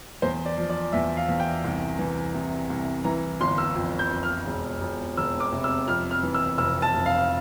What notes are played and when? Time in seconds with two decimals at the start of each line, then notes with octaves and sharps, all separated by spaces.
0.22 E2 C5
0.45 D5
0.57 F3
0.70 D5
0.93 E2 E5
1.17 F5
1.29 E2
1.40 G5
1.64 C2
1.99 E3
2.34 C3
2.70 C2
3.04 E3 A#5
3.41 G1 C6
3.58 E6
3.75 F2
3.99 G6
4.11 F2
4.23 F6
4.46 E1
4.81 E1
5.17 E1 E6
5.40 D6
5.53 C3
5.64 E6
5.87 F2 F6
6.11 F6
6.23 E3
6.34 E6
6.58 F1 E6
6.82 A5
6.94 F1
7.06 F5